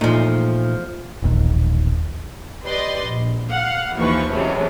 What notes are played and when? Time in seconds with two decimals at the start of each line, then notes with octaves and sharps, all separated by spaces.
0.01 E2 A#2 F3 A3 D#4
1.22 E1 A#1 D#2
2.67 G4 B4 D5 D#5 C6
3.06 A#1
3.50 F5 F#5
3.96 D#2 E3 F3 B4 C#6
4.32 C3 E3 F#3 G#3 A3 C#4